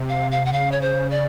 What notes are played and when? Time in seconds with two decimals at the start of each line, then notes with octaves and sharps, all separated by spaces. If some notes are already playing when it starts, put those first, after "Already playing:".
Already playing: C3
0.09 F5
0.31 F5
0.45 F#5
0.52 C#3 F5
0.72 C#5
0.81 C5
1.11 D5